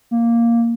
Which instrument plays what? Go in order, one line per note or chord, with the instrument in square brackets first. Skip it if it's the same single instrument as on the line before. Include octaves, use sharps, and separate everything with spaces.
[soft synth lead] A#3